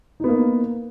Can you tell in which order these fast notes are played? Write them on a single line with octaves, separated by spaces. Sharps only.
D#4 B3 A#3